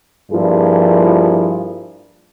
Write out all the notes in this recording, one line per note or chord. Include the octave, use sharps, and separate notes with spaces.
G2 F3 A#3 E4 F4 G#4